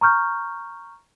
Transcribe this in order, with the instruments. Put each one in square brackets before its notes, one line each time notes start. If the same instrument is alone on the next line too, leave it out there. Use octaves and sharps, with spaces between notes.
[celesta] A#5 C#6 F6 G6